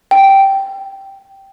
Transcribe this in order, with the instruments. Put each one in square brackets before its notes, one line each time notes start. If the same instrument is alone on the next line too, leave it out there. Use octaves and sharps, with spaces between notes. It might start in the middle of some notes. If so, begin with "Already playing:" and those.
[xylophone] G5